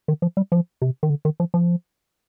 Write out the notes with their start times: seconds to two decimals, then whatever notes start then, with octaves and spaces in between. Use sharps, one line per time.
0.08 D#3
0.22 F3
0.37 G3
0.52 F3
0.82 C3
1.03 D#3
1.10 D3
1.25 D#3
1.40 F3
1.54 F3